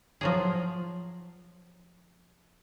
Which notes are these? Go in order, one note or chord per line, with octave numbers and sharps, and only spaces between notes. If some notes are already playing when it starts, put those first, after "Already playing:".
F3 F#3 G#4